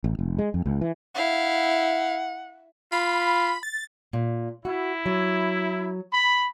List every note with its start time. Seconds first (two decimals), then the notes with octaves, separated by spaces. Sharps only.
0.04 A1
0.19 F1
0.38 G#3
0.54 F2
0.66 C#2
0.81 E3
1.15 E4 F5 F#5
2.92 F4 B5
3.63 A6
4.13 A#2
4.65 E4 F#4
5.06 F#3
6.13 B5